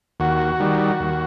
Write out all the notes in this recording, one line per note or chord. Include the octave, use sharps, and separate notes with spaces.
D#2 F#4
D#3 G3
D#2